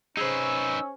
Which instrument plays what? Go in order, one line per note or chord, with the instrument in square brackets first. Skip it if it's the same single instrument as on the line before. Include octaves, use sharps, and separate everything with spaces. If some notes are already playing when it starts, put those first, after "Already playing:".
[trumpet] C#4 [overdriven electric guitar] D#4 B4 [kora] G#4 C5 [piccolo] E6